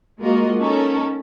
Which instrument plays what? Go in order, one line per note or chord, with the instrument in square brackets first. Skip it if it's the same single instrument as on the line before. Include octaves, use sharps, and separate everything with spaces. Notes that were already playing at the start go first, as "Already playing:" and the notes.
[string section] G#3 A#3 F4 F#4 A#4 D#5
B3 C#4 D#4 A4 A#4